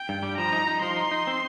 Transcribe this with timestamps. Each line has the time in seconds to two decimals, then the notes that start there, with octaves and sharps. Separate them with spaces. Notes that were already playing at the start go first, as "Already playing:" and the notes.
Already playing: G5
0.09 G2
0.23 G3
0.38 F3 A#5
0.52 D#4
0.67 D#4
0.82 F3 C6
0.96 D#4
1.11 D#4
1.27 C4